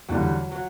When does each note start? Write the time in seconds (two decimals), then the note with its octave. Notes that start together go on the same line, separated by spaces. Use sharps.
0.09 E2 D3 F#3 G3
0.52 F#3